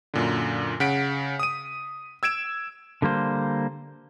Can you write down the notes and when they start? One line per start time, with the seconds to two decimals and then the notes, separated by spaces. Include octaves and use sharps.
0.14 F#2 A#2 D3
0.80 C#3 F#5 B6 D7
1.39 D#6 D#7
2.23 E6 G#6 D7 E7
3.02 D3 G3 A#3 C5